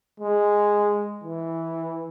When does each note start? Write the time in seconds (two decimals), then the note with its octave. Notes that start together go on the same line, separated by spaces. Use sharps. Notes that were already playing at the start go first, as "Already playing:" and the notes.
0.20 G#3
1.24 E3